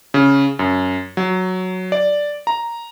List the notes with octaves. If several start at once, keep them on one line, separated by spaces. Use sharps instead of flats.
C#3
F#2
F#3
D5
A#5